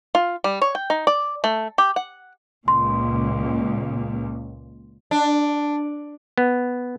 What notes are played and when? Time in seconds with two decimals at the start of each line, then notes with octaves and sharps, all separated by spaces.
0.15 F4
0.44 G3
0.62 C#5
0.75 G5
0.90 D#4
1.07 D5
1.44 A3
1.78 G4
1.96 F#5
2.68 C#2 A#2 C6
5.11 D4
6.38 B3